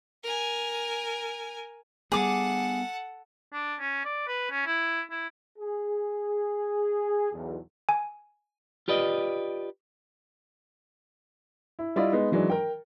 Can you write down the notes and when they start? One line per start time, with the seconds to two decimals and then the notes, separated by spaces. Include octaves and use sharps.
0.23 A#4 G#5
2.12 G3 A#3 B3 G#4 A4 F#5 D6
3.53 D4
3.80 C#4
4.04 D5
4.27 B4
4.51 C#4
4.66 E4
5.10 E4
5.59 G#4
7.33 B1 E2
7.89 G#5
8.88 F4 G4 B4 D5 D#5
11.79 E4
11.96 G3 E4 F4 D5 D#5
12.12 G#3 B3 D#4
12.31 D#3 E3 F#3 G#3 D4
12.50 A#4 G5